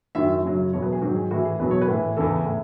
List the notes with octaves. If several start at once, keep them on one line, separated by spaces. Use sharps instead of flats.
F#2 D#3 F#3 E5
F#2 C#3 F#3
E2 B2 F#3 C#5
B4
G#4
G#2 D#3 F#3 F#4
G#4
A2 E3 F#4
G#4
E2 B2 F#3 B4
C#5
B4
A2 E3
E2 C#3 E3 A4
A2